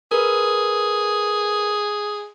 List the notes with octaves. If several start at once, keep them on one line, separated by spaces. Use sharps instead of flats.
G#4 A#4 B4